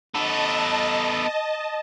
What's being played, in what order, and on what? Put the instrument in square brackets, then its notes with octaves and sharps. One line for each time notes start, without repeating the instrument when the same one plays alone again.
[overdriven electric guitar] B3 A4 [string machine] D#5 A5